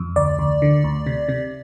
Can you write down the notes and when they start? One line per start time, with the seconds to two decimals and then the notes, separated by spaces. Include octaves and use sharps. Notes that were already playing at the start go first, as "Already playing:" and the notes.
Already playing: F2
0.16 D2 D5
0.39 D2
0.62 D3
0.84 D2
1.06 C3
1.28 C3